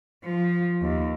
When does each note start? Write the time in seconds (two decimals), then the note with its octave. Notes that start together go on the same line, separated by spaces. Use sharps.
0.24 F3
0.81 D#2